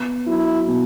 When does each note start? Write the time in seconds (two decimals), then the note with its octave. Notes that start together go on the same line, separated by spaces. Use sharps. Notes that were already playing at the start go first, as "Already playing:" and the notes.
Already playing: B3
0.27 F#3 E4
0.67 B2